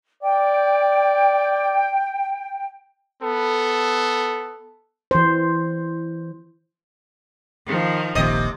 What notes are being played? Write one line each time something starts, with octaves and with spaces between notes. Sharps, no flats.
D5 G5
B3 A4
E3 C5
D#3 F3
D#1 A#1 D#2 C3 D#5